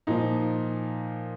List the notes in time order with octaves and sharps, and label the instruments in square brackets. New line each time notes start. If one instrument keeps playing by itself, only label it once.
[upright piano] A#2 F3 D#4